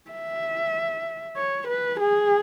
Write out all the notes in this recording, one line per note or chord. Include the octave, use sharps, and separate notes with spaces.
E5
C#5
B4
G#4